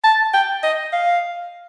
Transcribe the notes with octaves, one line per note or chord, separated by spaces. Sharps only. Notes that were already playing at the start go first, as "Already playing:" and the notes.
A5
G5
D#5
F5